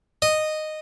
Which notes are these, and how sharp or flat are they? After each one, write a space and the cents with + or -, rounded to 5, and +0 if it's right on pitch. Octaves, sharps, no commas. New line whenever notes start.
D#5 -10